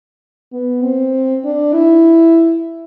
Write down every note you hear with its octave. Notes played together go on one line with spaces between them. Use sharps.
B3
C4
D4
E4